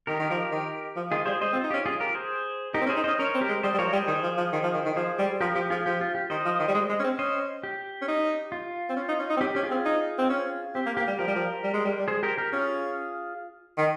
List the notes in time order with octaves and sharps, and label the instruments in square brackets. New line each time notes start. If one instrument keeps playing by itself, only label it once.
[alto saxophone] D#3 [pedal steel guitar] G4 A#4
[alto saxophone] D#3
F3
D#3
F3
[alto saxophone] D#3 [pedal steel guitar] F4 G#4
[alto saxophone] G3 [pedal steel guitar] G#4 C5
[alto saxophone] G#3 [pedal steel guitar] C5 D#5
[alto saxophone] C4
[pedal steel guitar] F4
[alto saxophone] D#4
[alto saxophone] C#4 [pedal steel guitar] G4
[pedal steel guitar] F4 G#4
G4 A#4
G#4 C5
[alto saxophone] D#4 [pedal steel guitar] G4 A#4
[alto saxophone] C4
C#4
[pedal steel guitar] G#4 C5
[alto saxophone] D#4
[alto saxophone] C#4 [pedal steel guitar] C5 D#5
[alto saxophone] C#4 [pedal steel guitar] A#4 C#5
[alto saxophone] C4
[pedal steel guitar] G4 A#4
[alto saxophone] G#3
[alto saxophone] G3 [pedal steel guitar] C5 D#5
[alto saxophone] G3
[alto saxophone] F3 [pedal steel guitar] A#4 C#5
[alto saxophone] G3 [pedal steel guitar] G#4 C5
[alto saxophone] D#3
F3
F3
D#3
F3
D#3
D#3
[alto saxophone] F3 [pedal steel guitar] G#4 C5
[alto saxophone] G3
[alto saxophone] F3 [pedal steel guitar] G4 A#4
[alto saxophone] F3 [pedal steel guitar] G4
[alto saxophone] F3 [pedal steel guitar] F4 G#4
[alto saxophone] F3 [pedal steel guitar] G4
[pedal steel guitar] F4
G4
[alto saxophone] D#3 [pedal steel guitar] C5 D#5
[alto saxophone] F3
D#3
G3
G#3
G#3
C#4
C4
[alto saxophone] C#4 [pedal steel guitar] C5 D#5
[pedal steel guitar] G4
[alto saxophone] C#4
D#4
[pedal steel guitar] F4
[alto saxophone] C4
C#4
D#4
C#4
D#4
C4
[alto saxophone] C#4 [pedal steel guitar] G4
[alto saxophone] C#4 [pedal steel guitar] G4
[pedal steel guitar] F4 G#4
[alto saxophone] C4
D#4
C4
C#4
[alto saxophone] C4 [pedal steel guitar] G4
[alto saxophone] A#3
[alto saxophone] A#3 [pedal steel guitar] G4
[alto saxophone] G3
[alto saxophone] F3 [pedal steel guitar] G4 A#4
[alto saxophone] G3
F3
G3
G#3
G3
G3
[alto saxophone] G#3 [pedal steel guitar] G#4 C5
[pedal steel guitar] G4 A#4
G4 A#4
[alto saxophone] C#4 [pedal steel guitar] F4 G#4
[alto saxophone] D#3